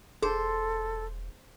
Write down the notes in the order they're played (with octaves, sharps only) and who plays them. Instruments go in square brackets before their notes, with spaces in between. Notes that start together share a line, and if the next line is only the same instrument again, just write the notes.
[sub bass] E1 [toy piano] G#4 [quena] A4 [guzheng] C5